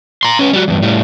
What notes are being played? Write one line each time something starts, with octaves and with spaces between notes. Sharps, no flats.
A#5 C6
C#4 B4
G3 F#4
E2 G2
A2 G3